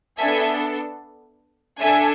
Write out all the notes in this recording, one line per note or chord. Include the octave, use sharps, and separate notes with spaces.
B3 D4 A4 E5 G#5
D4 A4 E5 G#5